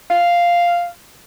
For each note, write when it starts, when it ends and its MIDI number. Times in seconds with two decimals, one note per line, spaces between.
0.11 0.87 77